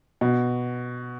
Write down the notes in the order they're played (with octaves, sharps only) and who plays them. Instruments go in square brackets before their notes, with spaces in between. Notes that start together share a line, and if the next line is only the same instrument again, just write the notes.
[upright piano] B2